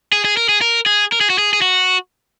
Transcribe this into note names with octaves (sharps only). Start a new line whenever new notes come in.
G#4
G#4
A#4
G#4
A#4
G#4
A#4
G#4
F#4
G#4
G#4
F#4